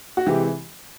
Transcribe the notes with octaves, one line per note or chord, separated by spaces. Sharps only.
F#4
C3 E3 G#3 G4